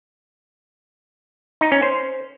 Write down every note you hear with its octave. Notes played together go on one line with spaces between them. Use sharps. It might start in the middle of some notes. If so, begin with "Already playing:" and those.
D#4
C#4
C5